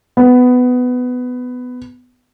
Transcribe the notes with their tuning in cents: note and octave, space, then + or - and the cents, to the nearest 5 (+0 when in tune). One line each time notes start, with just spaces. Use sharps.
B3 +15